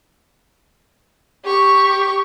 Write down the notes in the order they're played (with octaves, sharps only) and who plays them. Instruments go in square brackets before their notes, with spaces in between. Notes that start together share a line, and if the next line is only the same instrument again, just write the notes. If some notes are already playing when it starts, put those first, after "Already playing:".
[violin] G4 C#6